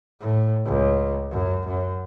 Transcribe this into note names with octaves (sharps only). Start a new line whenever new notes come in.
A2
C#2
F#2
F#2